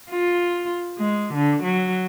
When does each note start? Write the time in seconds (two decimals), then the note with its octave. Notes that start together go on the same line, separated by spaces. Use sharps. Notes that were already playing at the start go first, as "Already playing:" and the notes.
0.10 F4
0.98 G#3
1.34 D3
1.63 F#3